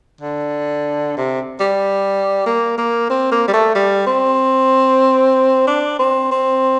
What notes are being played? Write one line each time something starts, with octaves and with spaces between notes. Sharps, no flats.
D3
C3
G3
A#3
A#3
C4
A#3
G3
A3
G3
C4
D4
C4
C4